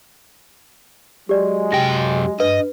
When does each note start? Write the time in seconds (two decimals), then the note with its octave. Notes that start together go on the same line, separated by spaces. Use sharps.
1.29 F#3 G#3 G4 D5
1.72 F#2 C3 G5 A#6
2.40 G2 B4 D#5